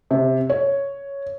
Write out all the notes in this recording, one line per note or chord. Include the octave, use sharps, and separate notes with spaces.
C3
C#5